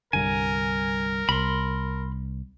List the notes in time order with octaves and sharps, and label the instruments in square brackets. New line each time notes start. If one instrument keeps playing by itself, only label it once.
[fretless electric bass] C2 G2 D3 [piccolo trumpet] A#4 [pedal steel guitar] G#5
[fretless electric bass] C2 [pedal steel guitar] B5 C6